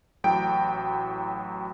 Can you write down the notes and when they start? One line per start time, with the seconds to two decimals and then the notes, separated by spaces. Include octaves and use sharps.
0.24 A1 A2 F#3 G5 A#5 D7